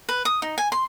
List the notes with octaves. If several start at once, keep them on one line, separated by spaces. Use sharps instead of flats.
B4
D#6
D#4
G#5
C6